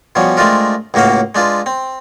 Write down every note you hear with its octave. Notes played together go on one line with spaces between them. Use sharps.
B2 F3 G3 C#4
G#3 A3 C4 D4 F4 A#4
C#2 A2 A#3 F#4 F5
G#3 D4 F4 B4
C4